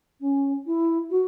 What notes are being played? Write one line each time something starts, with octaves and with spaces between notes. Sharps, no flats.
C#4
E4
F#4